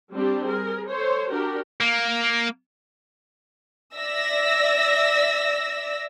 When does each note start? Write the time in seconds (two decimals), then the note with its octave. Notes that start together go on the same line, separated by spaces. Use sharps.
0.13 G3 C4 D4 G4
0.46 G#4 A#4
0.89 A4 C5 C#5
1.31 D4 F#4 G4 A#4
1.81 A#3
3.97 D5 E5 E6 A#6